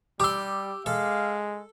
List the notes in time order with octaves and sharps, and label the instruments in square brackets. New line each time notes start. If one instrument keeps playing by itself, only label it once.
[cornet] G3 [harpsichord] G4 C6 [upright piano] D6 E6
[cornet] G#3 [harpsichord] A4 [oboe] F5